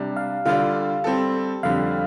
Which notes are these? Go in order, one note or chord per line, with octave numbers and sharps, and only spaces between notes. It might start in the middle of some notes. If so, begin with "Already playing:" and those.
Already playing: C3 G3 D4
F5
D3 G3 F4 D5 F5
G3 C4 A4
F2 D3 G3 F5